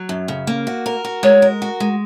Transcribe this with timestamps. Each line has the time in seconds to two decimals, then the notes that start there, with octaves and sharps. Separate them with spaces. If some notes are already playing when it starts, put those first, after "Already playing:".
Already playing: F#3
0.09 F#2
0.28 C#3
0.47 A#3
0.67 F#4
0.86 A#4
1.05 F#4
1.23 G#3 C#5
1.42 A#4
1.62 F#4
1.80 G#3